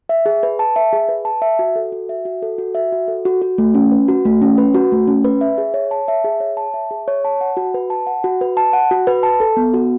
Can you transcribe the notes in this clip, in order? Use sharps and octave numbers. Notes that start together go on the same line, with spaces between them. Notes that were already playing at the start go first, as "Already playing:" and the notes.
E5
G#4
B4
A5
E5
G#4
B4
A5
E5
F#4
A4
F#4
E5
F#4
A4
F#4
E5
F#4
A4
F#4
F#4
A3
C#4
B4
F#4
A3
C#4
B4
F#4
A3
C#4
B4
E5
G#4
C#5
A5
E5
G#4
C#5
A5
E5
G#4
C#5
A5
F#5
F#4
B4
A5
F#5
F#4
B4
A5
F#5
F#4
B4
A5
A4
B3
F#4